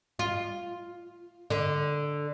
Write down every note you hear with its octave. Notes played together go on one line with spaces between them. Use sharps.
F4
D3